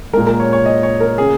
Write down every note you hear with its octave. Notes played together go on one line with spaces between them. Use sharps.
A#2 G#3 A#4
A#4
C#5
C#5
D#5
C#5
A#4
C#3 A#3 G#4